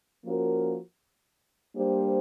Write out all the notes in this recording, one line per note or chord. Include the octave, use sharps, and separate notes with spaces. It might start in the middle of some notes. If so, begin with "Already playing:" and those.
F3 A#3 C#4 F#4 A#4
G3 A#3 D4 G4 C5